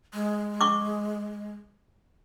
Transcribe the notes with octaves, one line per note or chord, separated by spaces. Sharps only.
G#3
C#6 D6